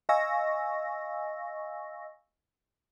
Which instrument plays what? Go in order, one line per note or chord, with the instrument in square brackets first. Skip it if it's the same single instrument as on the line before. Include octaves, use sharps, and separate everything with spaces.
[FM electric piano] D#5 F5 G#5 C#6 E6 A#6